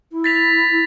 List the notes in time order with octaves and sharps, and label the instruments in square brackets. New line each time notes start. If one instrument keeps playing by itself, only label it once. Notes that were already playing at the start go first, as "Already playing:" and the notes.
[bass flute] E4
[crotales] A6 B6 F7
[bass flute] E4